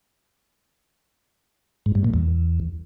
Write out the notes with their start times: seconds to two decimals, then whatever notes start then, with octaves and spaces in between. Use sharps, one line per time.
1.86 G#2
1.95 G2
2.04 A#2
2.14 E2